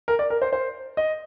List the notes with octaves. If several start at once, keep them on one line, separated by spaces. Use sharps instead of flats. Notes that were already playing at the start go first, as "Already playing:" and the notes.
A#4
D5
A#4
C5
C5
D#5